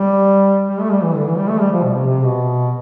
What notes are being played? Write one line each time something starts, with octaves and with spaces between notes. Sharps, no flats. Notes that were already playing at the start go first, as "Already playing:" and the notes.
Already playing: G3
G3
A3
G3
E3
D3
E3
G3
A3
G3
F3
B2
C3
C3
B2